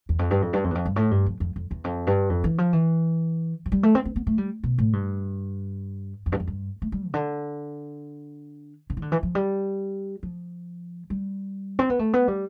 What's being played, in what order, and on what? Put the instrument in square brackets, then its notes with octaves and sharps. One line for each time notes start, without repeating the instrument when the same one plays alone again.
[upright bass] E2
F2
G2
F2
G2
F2
E2
F2
G2
A2
G2
F2
F2
F2
E2
F2
G2
F2
E3
F3
E3
F3
G3
A3
C4
C4
B3
A3
G3
B2
A2
G2
F2
G2
F2
G2
A3
G3
C3
D3
D3
E3
D3
E3
F3
G3
F3
G3
C4
B3
A3
B3
G3